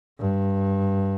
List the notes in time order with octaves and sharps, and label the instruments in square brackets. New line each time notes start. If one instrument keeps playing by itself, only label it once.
[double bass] G2